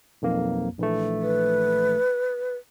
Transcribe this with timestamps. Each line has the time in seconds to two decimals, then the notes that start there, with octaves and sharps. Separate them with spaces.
0.22 B1 F2 A#3
0.78 A#1 E3 A3
1.20 B4